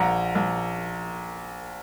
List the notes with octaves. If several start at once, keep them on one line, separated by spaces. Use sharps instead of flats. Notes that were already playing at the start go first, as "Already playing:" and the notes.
Already playing: A#1 F#5 A#5
A#1